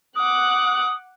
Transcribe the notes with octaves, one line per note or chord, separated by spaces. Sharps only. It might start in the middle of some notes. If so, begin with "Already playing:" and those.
F#5 D6 D#6 F#6